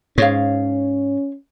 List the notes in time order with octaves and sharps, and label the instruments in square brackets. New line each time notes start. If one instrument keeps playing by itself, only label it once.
[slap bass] G#2 [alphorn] C#4 [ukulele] C#5 F5